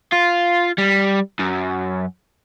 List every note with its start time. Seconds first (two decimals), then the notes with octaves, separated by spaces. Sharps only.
0.13 F4
0.78 G3
1.39 F#2